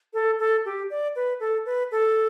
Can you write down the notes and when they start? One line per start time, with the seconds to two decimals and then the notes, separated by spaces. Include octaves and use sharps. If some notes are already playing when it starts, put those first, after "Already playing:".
0.14 A4
0.39 A4
0.65 G4
0.90 D5
1.16 B4
1.40 A4
1.66 B4
1.91 A4